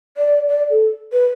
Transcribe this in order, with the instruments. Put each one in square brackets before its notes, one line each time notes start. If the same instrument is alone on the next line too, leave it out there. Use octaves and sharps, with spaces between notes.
[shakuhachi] D5
D5
A4
B4